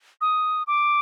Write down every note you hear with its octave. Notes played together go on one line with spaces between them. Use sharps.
D#6
D6